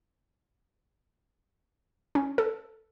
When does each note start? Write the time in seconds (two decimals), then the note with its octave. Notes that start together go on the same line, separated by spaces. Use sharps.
2.15 C#4
2.38 A4